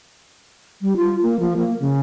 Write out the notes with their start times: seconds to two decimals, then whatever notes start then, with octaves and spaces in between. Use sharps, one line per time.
0.82 G3
0.96 F4
1.22 A#3
1.40 F3
1.57 A#3
1.80 C#3